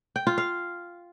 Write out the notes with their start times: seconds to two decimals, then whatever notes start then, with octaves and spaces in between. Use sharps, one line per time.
0.16 G5
0.27 F4
0.38 F5